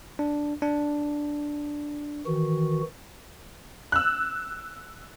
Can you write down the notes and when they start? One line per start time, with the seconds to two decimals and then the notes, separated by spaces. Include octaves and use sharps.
0.19 D4
0.62 D4
2.26 D#3 E3 F#4
3.92 E6 F#6